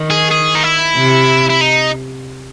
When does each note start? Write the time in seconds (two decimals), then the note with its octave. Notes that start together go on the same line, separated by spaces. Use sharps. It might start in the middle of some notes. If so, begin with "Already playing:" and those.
Already playing: D#3
0.10 G#4
0.31 G#4
0.55 D#4
0.63 E4
0.96 C3
1.49 E4
1.61 D#4